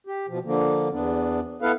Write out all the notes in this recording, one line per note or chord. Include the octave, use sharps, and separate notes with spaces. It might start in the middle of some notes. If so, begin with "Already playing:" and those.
G4
B2 F3
D3 F3 A#3
E2 B3 D4
B3 E4 A4 B4 F5